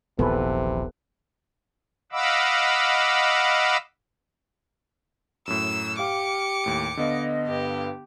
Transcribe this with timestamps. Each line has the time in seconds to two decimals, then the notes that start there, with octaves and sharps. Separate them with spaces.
0.19 D#1 A#1 C3 E3 B3 A4 B4
2.12 D#5 F5 F#5 B5 D6 E6
5.47 F#2 A2 E6
5.99 G4 F5 D6 C#7
6.64 D#2 A2 D7
6.97 D3 B3 D#5 F5
7.47 G2 G4